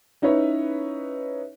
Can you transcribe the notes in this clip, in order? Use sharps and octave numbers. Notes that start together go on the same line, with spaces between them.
C#4 D#4 E4 B4 C#5